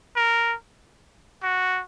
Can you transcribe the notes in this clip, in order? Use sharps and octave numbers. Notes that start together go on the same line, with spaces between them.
A#4
F#4